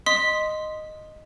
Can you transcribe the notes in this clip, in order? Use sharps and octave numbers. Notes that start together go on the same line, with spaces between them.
D#5 C6 D#6 B6